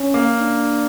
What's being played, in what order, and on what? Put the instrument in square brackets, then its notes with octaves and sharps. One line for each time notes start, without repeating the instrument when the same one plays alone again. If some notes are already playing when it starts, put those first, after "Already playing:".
Already playing: [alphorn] C#4
[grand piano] A#3
[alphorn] D4